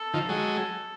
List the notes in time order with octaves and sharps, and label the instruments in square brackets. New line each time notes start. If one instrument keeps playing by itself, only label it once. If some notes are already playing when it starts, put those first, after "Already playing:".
Already playing: [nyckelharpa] A4
[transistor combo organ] D#3 F3
F#3 G#3